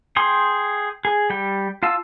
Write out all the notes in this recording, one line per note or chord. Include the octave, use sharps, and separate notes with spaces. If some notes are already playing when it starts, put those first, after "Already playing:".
G#4 G5 C6
G#4
G3 G5
F4 F5 A5 E6